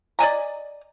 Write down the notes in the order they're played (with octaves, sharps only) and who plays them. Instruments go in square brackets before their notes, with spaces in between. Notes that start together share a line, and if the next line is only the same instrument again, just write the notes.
[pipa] D5 D#5 G#5 A#5